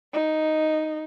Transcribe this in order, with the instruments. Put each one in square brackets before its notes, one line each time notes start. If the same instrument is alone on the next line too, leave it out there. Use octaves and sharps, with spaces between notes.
[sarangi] D#4